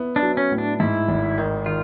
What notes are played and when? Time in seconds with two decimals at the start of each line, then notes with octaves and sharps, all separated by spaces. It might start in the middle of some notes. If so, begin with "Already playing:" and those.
Already playing: B3 E4
0.16 D4
0.23 F#3
0.37 C#4
0.51 A2
0.58 D4
0.80 G#2 E4
1.09 G#1
1.38 D#3
1.66 D#3 F4